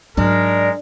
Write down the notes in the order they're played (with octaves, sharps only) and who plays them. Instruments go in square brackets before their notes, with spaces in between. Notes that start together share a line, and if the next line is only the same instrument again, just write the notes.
[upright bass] G#2 F#3 [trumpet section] G#3 A#4 [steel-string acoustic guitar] D4